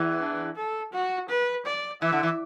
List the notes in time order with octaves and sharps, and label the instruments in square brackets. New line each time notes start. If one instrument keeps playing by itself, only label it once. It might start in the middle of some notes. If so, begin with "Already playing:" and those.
Already playing: [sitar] E2 E3
[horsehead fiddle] D4
A4
F#4
B4
D5
[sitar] E3 [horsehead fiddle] E5
[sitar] D3
E3